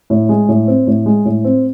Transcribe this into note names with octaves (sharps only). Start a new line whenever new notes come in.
A2
G#3
A2
C4
A2
G#3
A2
C4